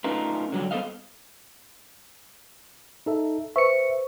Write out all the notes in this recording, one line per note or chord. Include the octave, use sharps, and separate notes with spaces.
A3 C#4 D#4 F4 A#4 B4
D3 F#3 G3
B3 A4 C5 D#5 F5
D#4 A4 E5
B4 C5 E5 C#6 C#7